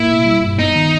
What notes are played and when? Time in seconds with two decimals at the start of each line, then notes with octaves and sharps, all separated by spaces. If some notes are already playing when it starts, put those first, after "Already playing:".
Already playing: A2 A#3 E4
0.10 B2
0.25 G3
0.42 G2
0.59 B3 D#4
0.76 D#3